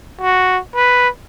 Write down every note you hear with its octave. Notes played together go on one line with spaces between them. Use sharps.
F#4
B4